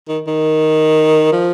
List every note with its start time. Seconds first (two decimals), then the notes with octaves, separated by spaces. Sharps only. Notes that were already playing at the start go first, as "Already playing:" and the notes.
0.08 D#3
0.27 D#3
1.32 F3